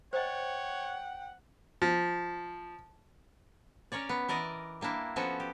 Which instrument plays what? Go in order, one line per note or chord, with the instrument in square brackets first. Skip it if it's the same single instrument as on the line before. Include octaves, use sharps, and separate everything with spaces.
[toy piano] C5 D#5 [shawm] C#5 [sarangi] F#5 [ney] G5
[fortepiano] F3
[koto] C#4 A#4 C#5 D5
B3
E3 A#4 D5 D#5
G3 A#3 D4 E4
F3 B3 C#4 F#4 A4
G4